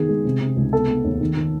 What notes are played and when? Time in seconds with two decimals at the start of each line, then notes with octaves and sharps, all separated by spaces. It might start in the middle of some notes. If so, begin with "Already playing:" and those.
Already playing: D#3 B3 G#4
0.09 G#3
0.25 C3
0.41 C3
0.57 C#2
0.73 B3 A4
0.89 B3
1.05 D#2
1.21 D#3
1.37 D#3